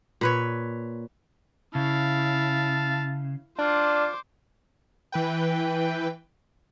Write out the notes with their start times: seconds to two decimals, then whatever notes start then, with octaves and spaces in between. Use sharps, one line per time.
0.21 A#2 B4 C#5
1.75 C#3 E4 F5 A5
3.59 D4 F4 C5 D6
5.12 E3 B4 G5